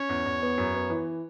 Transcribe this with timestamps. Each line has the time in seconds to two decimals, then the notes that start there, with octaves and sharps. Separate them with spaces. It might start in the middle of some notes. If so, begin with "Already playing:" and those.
Already playing: C#4 C#5
0.09 E2
0.26 E2
0.42 B3
0.58 F#2
0.74 B3
0.90 E3